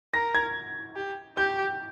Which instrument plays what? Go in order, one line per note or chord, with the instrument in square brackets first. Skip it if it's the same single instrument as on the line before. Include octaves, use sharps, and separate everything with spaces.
[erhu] A#4 [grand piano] A#6
[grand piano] G#6
[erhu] G4
[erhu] G4 [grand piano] G6